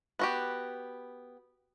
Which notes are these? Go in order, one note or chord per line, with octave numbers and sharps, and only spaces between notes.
B3 F#4 G4